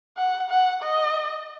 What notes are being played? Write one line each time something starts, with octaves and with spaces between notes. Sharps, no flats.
F#5
F#5
D#5